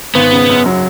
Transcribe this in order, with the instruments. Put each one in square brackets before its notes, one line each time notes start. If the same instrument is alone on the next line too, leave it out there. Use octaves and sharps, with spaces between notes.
[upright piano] G#1 [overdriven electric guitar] B3
[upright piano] C#3
F#2
F#3